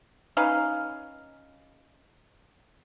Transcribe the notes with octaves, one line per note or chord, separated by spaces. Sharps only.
C#4 D#4 B4 F5